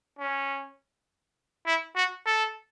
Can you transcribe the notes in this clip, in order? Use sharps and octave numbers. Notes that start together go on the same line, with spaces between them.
C#4
E4
F#4
A4